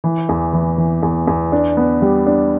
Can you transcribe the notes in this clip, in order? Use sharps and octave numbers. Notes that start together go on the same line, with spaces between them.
E3
E2
E3
E3
E2
E2
D4
B3
G3
D4